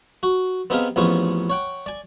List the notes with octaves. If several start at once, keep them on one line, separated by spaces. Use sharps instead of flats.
F#4
B3 C4 D#4 G4 G#4 F5
A1 F2 B3 C#4 G#4 C5
C#5 F#5 G5
D5 G#5